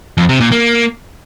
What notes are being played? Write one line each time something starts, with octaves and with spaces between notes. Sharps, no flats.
F2
C3
A#2
A#3